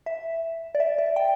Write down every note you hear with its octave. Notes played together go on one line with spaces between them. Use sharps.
E5
D5
E5
D5
G5